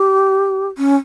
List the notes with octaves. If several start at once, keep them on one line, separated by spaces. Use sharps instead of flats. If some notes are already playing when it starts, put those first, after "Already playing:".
Already playing: G4
C#4